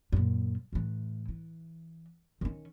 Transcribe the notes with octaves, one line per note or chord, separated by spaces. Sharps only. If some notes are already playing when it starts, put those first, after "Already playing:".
F#2 A#2
A2 E3
E3
D#3 C#4